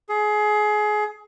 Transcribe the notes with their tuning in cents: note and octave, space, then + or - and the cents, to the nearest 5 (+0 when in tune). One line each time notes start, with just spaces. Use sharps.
G#4 +25